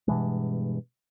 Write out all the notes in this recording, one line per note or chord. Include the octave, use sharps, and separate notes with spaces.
G2 B2 E3 G#3